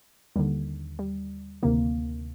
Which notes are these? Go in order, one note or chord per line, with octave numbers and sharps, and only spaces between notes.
D#2 D3 G3
G3
D2 C3 D#3 A#3